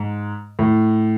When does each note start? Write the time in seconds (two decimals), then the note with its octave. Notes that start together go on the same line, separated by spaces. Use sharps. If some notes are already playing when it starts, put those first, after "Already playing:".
Already playing: G#2
0.59 A2